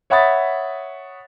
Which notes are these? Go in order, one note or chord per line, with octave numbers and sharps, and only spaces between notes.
C#5 E5 F#5 B5 D#6 A6